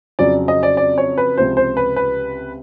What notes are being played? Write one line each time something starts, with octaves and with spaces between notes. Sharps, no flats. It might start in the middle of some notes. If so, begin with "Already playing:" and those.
F2 C#3 F#3 D5
D#5
D5
D5
C#5
B4
C#2 C3 F3 C5
C5
B4
B4